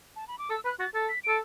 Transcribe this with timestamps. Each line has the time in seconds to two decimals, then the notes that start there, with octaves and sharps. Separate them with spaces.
0.16 A5
0.28 B5
0.39 D6
0.50 A4 E6
0.65 B4 F#6
0.79 F#4 A6
0.94 A4 A6
1.09 B6
1.24 A4 D7